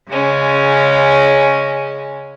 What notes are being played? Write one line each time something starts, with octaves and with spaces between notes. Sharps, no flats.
C#3 G#3 C#4